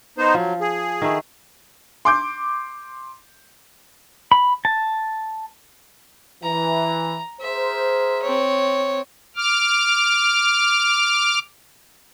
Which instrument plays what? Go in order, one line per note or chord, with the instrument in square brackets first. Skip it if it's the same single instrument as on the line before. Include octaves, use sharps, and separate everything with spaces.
[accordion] B3 D#4 C5
[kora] F3 [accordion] F#3
[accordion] G#4
[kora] D#3 A3
[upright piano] C6 D6 G6
[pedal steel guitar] B5
A5
[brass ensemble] E3 [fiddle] A#5
[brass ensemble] G#4 A#4 C5 [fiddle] E5
[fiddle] C4 C#5
[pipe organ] D6 F6